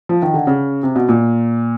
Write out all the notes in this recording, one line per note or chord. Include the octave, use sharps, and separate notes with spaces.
F3
D#3
D3
C#3
C3
B2
A#2